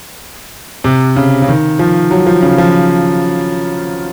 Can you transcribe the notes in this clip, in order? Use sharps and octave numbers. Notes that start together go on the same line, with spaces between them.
C3
C#3
C#3
D#3
F3
F#3
F3
C#3
F3